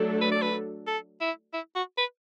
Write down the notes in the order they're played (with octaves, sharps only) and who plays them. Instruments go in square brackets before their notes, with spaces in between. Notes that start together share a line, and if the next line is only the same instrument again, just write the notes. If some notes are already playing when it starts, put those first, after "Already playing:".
Already playing: [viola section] F#3 A3 D4 A4
[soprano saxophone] B4
D5
B4
A4
E4
E4
F#4
B4